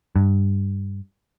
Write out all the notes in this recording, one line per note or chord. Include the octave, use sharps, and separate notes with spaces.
G2